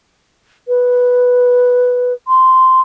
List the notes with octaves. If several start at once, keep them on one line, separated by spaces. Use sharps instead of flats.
B4
C6